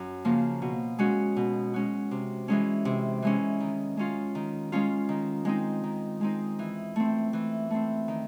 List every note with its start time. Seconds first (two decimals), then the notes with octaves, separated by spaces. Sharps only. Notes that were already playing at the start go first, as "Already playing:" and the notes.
Already playing: F#2
0.25 C#3 F3 A#3
0.62 B2
0.99 G#3 C#4 F#4
1.36 B2
1.74 G#3 C#4 F#4
2.11 C3
2.48 E3 G#3 C#4
2.85 C3
3.22 E3 G#3 C#4
3.60 D#3
3.97 G#3 C#4 F4
4.35 D#3
4.72 G#3 C#4 F4
5.09 D#3
5.45 G#3 C4 D#4
5.84 D#3
6.21 G#3 C4 D#4
6.59 E3
6.96 A3 C4
7.33 E3
7.70 A3 C4
8.08 D#3